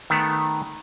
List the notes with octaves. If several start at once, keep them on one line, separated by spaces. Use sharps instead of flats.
D#3 A3 B3